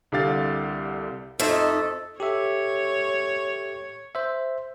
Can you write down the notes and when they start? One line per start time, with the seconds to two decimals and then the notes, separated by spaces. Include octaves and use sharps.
0.12 C2 D3 G4 F5 A6
1.40 F2 A3 D#4 A4
2.20 G4 A4 C#5 E5
4.15 C5 E5